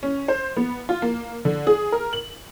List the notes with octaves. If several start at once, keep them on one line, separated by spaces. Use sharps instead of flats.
C#4
C5
B3
F4
A#3
D3
G#4
A#4
F#7